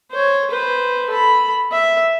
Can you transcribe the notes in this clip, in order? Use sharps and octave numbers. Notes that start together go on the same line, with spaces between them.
C5 C#5
B4 C5
A4 B5
E5